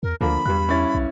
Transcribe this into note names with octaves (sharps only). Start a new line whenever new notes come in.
E2 A#4
D2 D3 F3 A#3 B5
E2 G2 G3 F#6
C#4 E4 A6
B1